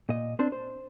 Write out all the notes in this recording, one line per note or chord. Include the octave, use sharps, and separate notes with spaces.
A#2 D#5
C4 D4 C5
C5